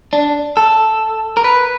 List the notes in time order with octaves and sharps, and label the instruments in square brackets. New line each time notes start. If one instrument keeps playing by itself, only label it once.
[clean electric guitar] D4
A4
A#4
B4